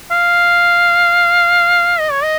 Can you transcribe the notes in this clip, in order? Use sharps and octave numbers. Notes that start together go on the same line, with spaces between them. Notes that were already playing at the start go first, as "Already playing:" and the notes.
F5
D#5
C#5
D#5